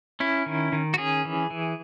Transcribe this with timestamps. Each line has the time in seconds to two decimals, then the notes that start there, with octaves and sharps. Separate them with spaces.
0.20 C#4 E4
0.46 D#3
0.72 D#3
0.94 F#4
0.98 C#4 G#4
1.25 E3
1.50 E3